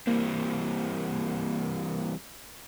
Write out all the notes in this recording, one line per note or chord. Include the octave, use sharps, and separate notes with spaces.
E3 G3 A#3 C4